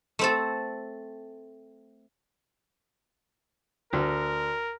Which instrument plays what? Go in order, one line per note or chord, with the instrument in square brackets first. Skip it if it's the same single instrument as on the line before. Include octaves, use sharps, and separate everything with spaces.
[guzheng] A3 C4 A4
[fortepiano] D2 [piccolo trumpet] A#4